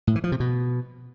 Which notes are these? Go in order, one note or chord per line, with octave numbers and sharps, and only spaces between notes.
A2
E3
F3
C3
B2